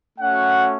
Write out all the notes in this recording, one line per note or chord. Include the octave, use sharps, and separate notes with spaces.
A3 C#4 F#4 F#5